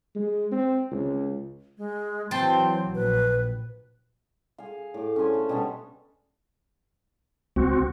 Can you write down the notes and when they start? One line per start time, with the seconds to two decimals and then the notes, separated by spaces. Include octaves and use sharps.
0.16 G#3
0.52 C4
0.92 C#2
1.78 G#3
2.31 E3 F#3 C4 G5 A5 C6
2.95 A#1 B4
4.58 G#4 F5
4.94 A2 D6
5.16 C#4 D4 C5 G#5
5.34 A3
5.49 B2 G3 C#4 D4
7.56 C#2 C4 F#4